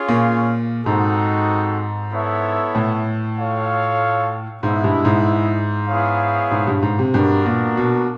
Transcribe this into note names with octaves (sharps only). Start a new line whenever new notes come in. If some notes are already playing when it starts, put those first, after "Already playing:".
Already playing: C#4 F4 G#4 C#5 F5
A#2
G#2 G#3 C4 D#4 F#4 A4
B3 E4 A4 C#5 E5
A2
F4 A4 C#5 F5
G#2 G#3 B3 E4
G2
G#2
B3 E4 G#4 C#5 F5
G#2
G2
G#2
C3
G2 B3 D4 F#4 A#4
A#2
B2